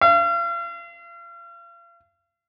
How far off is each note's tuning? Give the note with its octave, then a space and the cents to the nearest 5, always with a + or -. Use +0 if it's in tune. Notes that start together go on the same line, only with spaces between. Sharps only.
F5 -40